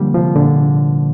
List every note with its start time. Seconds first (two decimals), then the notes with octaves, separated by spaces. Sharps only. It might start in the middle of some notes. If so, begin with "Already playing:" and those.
Already playing: D3 F3 G3 A#3
0.14 C3 F3
0.35 A#2 D3